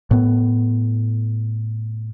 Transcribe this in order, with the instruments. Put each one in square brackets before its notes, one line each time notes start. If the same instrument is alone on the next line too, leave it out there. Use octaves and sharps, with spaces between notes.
[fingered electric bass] A2 B3